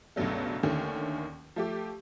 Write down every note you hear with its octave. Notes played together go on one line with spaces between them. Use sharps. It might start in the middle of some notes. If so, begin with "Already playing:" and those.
C#2 G2 B2 F#3 A3
D#2 D3 D#3 A3 C#4
F3 A3 G4